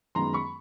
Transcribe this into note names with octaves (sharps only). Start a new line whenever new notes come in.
F#2 D#3 G#3 B3 A#5 C6
B5 C#6